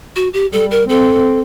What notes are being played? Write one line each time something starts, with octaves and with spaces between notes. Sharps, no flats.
F#4
G4
G3 A4
A#4
C4 A4